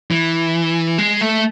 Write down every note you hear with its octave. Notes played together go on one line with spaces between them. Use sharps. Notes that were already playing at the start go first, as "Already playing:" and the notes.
E3
G#3
A3